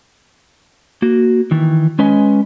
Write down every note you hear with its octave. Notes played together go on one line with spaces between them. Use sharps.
A#3 F#4
D#3 E3
G#3 C#4 B4 D#5 G#5